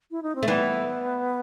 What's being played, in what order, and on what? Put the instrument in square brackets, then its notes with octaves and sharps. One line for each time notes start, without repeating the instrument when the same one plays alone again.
[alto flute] E4
D#4
C4
[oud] A3
[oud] E3 G3 [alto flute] B3